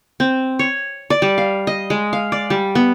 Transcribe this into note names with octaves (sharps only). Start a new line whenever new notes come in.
C4
C#5
D5
G3
F5
D#5
G#3
F5
D5
G3
B3